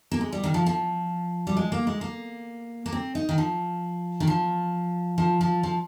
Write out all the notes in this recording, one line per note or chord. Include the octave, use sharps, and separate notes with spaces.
A#3
G#3
G3
D#3
F3
F3
G3
G#3
A#3
G#3
A#3
A#3
C4
D#4
D#3
F3
D#3
F3
F3
F3
F3